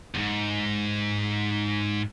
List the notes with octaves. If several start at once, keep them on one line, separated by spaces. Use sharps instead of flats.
E2 G#2